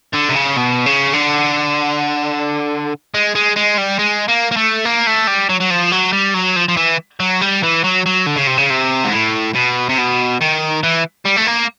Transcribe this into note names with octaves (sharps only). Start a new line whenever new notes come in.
D3
C3
C#3
B2
C#3
D3
G#3
G#3
G#3
G3
G#3
A#3
A#3
A3
A#3
A3
G3
F#3
F#3
F3
F#3
G3
F#3
F3
F3
E3
F#3
G3
E3
F#3
F#3
D3
C#3
C3
C#3
C3
G#2
A2
B2
C3
B2
D#3
E3
G3
A3
A#3